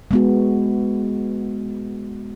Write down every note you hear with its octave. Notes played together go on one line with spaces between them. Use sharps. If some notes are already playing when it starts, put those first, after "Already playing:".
G#3 B3 F#4